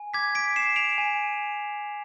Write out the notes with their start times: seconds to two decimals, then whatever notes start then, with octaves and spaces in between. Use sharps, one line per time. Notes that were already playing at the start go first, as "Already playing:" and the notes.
Already playing: G#5
0.14 D6 G#6 B6
0.35 B6 D7
0.56 D6 C7 E7
0.76 D7 F7
0.98 G#5